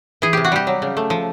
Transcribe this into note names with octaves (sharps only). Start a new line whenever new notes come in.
E3 G#4
C3 G4
F#4
G3 G4
F#3
C#3
A3
F3